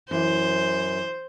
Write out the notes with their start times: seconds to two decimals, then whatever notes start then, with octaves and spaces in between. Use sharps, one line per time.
0.11 F#2 E3 C5